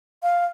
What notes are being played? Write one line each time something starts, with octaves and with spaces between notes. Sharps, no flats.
F5